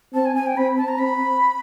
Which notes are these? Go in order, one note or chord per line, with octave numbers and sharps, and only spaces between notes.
C4 A5
G#5
G#5
G5
C4 B5
A5
A#5
C4 B5